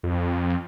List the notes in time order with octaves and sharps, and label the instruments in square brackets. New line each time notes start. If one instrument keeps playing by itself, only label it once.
[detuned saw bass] F2